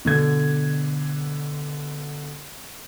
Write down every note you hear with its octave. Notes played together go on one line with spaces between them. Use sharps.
B2 D3 G#6